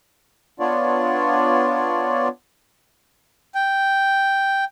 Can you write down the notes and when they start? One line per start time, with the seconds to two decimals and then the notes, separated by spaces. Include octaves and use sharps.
0.60 B3 D4 F4 C#5 D5
3.55 G5